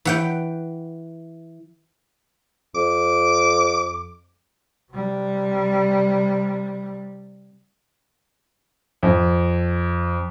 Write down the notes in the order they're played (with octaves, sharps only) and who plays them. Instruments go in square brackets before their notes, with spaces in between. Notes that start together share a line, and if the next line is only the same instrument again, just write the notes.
[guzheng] E3 F#5 G5
[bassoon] F2 [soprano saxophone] D6
[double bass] C3 G3
[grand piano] F2